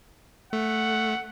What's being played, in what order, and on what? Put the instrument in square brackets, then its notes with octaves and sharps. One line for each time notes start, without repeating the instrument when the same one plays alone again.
[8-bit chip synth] A3 [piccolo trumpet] F#5